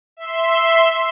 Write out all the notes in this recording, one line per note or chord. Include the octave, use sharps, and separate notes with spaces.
E5 C6